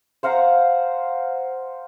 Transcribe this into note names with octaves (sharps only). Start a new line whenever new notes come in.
C5 F5 F#5 A#5